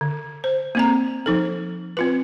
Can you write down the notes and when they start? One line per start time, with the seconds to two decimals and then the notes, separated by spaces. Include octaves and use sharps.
0.01 D3
0.44 C5
0.75 A#3 C4 A#5
1.26 F3 D#4 A4
1.97 C4 F4 B4